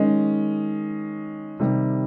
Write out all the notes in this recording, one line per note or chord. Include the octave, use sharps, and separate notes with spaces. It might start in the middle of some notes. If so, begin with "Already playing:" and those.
Already playing: D#3 G#3 C#4
C3 D#3 G3